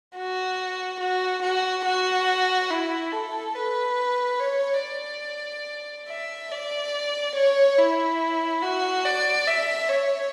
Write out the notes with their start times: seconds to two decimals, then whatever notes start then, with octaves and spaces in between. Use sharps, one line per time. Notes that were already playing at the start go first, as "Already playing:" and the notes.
0.16 F#4
1.00 F#4
1.43 F#4
1.85 F#4
2.70 E4
3.12 A4
3.55 B4
4.39 C#5
4.81 D5
6.08 E5
6.51 D5
7.35 C#5
7.78 E4
8.62 F#4
9.05 D5
9.47 E5
9.89 C#5